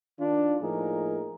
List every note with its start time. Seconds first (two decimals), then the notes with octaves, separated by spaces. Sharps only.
0.18 D#3 D4 F4
0.61 A2 F3 A#3 D#4 G#4 A#4